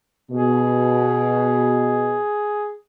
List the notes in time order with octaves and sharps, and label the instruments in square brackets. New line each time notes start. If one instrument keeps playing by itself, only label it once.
[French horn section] B2 [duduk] G#4